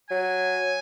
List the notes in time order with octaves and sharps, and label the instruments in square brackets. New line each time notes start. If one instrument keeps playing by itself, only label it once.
[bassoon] F#3 [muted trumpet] G#5